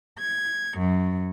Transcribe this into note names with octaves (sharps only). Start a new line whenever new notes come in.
G#6
F#2